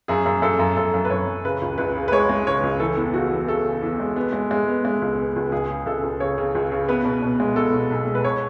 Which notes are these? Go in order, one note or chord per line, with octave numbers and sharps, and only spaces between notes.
F#2 G#4
F#2
F#2 A4
F#2
F#2 A4
F#2
B4
F#2 C#5
F#2
C#3 B4
C#2
C#2 B4
C#3
B4
G#3 C#5
G#3
C#3 C#5
C#2
E3 A4
E2
C#3 F#4
E2
C#3 A4
C#3
E2
G#3
B3
G#3
G#3
B3
G#3
C#2
B3
C#2
C#2 G#4
C#3
C#2 A4
C#2
C#3 C#5
C#3
C#2
C#3
B3 B4
B2
B2
G#3
B2 A4
B2
B1
G#3
B4
C#5